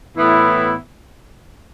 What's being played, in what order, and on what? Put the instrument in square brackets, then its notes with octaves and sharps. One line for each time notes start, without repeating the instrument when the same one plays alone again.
[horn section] A2 E3 B3 E4